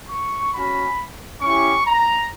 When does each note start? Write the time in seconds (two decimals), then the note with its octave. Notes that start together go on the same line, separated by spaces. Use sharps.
0.09 C#6
0.53 C#4 F#4 B5
1.41 C#4 E4 G4 C#6
1.86 A#5